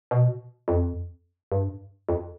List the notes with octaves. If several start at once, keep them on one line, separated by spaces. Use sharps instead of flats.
B2
F2
G2
F2